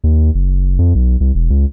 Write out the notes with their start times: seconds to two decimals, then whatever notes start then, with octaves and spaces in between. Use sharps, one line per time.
0.04 D#2
0.35 F#1
0.79 F2
0.95 B1
1.21 C2
1.35 E1
1.50 C#2